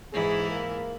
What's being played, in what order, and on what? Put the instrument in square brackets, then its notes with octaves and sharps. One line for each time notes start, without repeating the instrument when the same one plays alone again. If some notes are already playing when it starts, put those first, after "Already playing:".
[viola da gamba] G#2 E3 E4 [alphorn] G#4
[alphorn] A#3